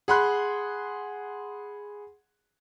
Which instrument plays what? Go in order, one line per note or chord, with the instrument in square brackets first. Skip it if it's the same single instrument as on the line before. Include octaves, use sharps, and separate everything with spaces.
[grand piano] G#4 F#5 B5 C6 F#6